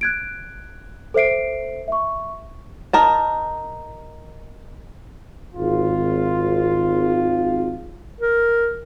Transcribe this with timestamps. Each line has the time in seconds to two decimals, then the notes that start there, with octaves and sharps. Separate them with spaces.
0.01 F#6 G#6 D7
1.14 A4 C5 E5 C7 D7
1.88 E5 C#6
2.93 D#4 A#4 A5
5.55 G#1 F4
8.21 A#4